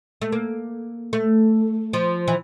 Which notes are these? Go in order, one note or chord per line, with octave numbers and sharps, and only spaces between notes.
A3
A#3
A3
F3
E3